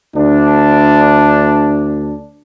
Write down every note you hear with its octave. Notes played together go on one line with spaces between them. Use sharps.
D2 D4